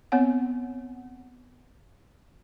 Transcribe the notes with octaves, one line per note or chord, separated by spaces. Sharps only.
B3 C4 C#5 F#5